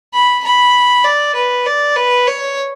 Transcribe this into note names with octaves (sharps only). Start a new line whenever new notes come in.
B5
B5
D5
B4
D5
B4
C#5